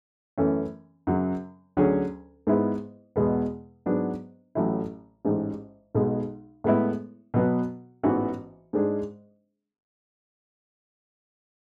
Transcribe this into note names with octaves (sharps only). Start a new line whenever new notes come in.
F#2 E3 A3 C#4
F#2 C#3 F#3
D2 D3 F#3 C#4 G#4
G#2 G#3 B3 E4
E2 B2 G#3 B3
G#2 F#3 B3 D4 G#4
A1 A2 F#3 A3 E4
A1 G#2 G#3
B1 B2 G#3
A2 G#3 B3 E4
B2 F#3 B3 F#4
A1 G#2 E3 B3 F#4
G#2 G#3 D4 G#4